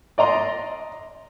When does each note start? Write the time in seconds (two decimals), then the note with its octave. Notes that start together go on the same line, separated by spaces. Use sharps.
0.18 D5 D#5 A#5 C6